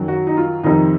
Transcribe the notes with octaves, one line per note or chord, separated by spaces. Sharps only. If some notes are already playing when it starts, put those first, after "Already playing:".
Already playing: F#2 D#3 F#3
F#4
D#4
F4
F2 C3 D#3 D#4